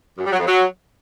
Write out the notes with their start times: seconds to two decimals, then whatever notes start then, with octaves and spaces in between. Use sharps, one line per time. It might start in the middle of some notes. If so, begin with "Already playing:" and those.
0.18 F#2
0.25 G3
0.32 F#3
0.39 F2
0.46 F#3